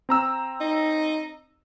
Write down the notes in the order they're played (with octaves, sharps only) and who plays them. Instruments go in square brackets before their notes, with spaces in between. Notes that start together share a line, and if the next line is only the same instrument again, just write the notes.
[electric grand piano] C4 A#5 E6
[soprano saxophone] D#4